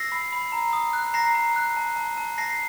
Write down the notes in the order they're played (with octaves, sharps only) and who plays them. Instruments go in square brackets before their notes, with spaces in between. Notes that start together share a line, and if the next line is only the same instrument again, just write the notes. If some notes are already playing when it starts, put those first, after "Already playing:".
Already playing: [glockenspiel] E6 A#6 C7
B5
B5
A#5
D#6
F#6
A#5 A#6 C7
A#5
F#6
A5
A5
A5
A5 A#6 C7